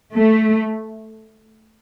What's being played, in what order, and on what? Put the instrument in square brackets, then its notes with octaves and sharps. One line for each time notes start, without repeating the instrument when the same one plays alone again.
[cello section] A3